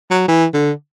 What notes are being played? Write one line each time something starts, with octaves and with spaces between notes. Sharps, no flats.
F#3
E3
D3